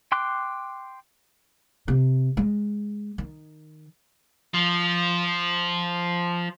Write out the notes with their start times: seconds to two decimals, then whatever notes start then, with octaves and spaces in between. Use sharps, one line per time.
0.12 G5 C6 D6 F#6
1.88 C3
2.37 G#3
3.18 D#3
4.54 F3 F4